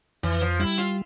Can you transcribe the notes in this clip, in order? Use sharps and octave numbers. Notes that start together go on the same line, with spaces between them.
F2 E3
F3
G3 E4
F4